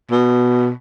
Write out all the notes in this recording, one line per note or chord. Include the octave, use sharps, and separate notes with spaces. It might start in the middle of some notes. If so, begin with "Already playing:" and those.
B2